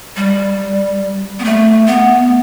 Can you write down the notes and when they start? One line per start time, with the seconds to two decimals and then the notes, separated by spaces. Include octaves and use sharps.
0.16 G3
1.39 B3
1.44 A3
1.87 B3